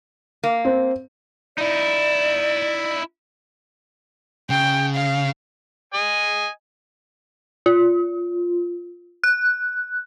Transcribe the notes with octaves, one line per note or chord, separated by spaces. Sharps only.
A#3
C4
D#4 E4 D5
C#3 G5
F5
D#5 G#5
F4
F#6